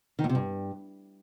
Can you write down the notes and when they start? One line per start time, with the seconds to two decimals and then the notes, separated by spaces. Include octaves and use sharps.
0.19 D#3
0.24 A2
0.29 C3
0.35 G2